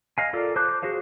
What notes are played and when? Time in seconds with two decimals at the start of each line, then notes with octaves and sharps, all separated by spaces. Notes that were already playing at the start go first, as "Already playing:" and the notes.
0.18 D#5 F5 G#5
0.33 F4 A4 A#4 D5
0.56 C5 A5 D6 F#6 G6
0.83 F#4 G#4 C5 F5